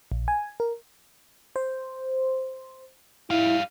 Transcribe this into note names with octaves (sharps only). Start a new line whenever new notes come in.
A#1
G#5
A#4
C5
G3 E4 F5